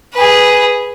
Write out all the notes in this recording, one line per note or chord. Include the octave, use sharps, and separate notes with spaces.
G#4 B4